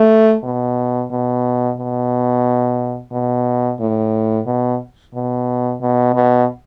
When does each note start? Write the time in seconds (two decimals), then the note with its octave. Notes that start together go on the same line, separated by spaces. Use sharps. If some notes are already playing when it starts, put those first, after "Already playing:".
Already playing: A3
0.44 B2
1.11 B2
1.78 B2
3.12 B2
3.80 A2
4.46 B2
5.14 B2
5.81 B2
6.14 B2